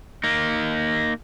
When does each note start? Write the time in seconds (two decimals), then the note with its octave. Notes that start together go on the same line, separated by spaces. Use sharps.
0.24 A#3 D#4